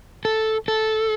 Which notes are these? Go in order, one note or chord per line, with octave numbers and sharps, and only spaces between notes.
A4
A4